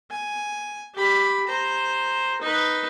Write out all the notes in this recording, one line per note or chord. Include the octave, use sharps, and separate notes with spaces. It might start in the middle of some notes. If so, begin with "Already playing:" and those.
G#5
G4 B5
C5 A#5
D#4 B4